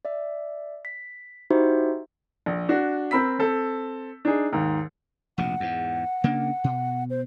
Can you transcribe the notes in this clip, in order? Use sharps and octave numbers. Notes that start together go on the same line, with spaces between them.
D5 E5
B6
D#4 E4 F#4 G4 C5 E5
A#1
D4 F#4
C4 A#4 B5 E6 B6
C4 A4
D4 D#4 G#4
D#2 G#2
F1 A#1 B2 F#5
E2 G#2
C#3 A#3 D4
B2
C5